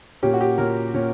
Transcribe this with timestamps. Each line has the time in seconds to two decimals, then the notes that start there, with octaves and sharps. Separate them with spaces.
0.23 A#2 A#3 C#4 G4
0.34 F#4
0.41 G4
0.58 A#2 A#3 C#4 A#4
0.94 A#2 A#3 C#4